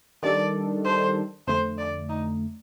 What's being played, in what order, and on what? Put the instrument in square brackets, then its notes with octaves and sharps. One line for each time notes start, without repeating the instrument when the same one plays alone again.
[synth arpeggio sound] D#3 G3 D4 A4 [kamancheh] D5
[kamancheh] C5
[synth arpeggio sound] F2 D3 A3 [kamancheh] C5
[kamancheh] D5
D#4